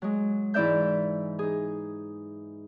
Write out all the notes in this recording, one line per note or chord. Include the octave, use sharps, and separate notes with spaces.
F#3 G#3
G#2 E3 E4 D5 E5 G6
D#4 G#4